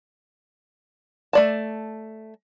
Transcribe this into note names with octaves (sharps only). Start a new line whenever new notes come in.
A3 D5 A5